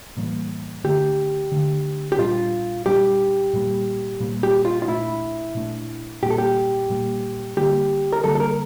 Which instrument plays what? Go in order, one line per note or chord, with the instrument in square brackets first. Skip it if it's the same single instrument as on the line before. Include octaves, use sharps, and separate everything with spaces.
[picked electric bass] A2 E3 G3 A#3
[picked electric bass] D3 A3 D4 [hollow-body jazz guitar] G4
[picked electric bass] D3 A3 D4
[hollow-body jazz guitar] G4
[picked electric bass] A#2 G3 D4 [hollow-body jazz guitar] F4
[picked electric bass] A#2 G3 D4 [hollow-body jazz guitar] G4
[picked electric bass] A#2 G3 A#3
A#2 G3 A#3
[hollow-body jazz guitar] G4
F4
F4
[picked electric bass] A#2 A3 D4 [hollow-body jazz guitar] E4
[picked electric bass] A#2 A3 D4
[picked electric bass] A#2 G3 A#3 [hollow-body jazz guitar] G4
[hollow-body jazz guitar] A4
G4
[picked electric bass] A#2 G3 A#3
[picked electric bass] D3 G3 A#3 [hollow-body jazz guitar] G4
[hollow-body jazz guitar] A#4
[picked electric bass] D3 G3 A#3 [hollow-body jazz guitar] A4
[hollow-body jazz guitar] A4
A#4